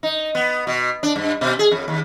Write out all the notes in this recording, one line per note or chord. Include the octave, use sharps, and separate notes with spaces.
D#4
B3
B2
D4
G2
B2
G#4
F2
D#2